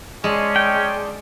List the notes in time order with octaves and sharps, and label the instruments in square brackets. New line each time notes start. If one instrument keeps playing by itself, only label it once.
[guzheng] G#3 [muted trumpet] C#4 [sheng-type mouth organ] D5 A5 C6
[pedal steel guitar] G5